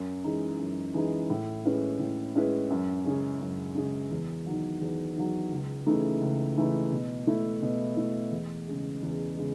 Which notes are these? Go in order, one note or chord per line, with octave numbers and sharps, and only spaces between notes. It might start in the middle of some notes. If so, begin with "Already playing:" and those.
Already playing: F#2
E3 G#3 D#4
F#2
E3 G#3 D#4
A2
G#3 C#4 E4 B4
A2
G#3 C#4 E4 B4
F#2
C#3 G#3 C#4 G#4
F#2
C#3 G#3 C#4 G#4
E2
D#3 F#3
E2
D#3 F#3
C#2
C#3 E3 A3 D#4
C#2
C#3 E3 A3 D#4
B2
A3 E4
B2
A3 E4
E2
C#3 G#3
E2
C#3 G#3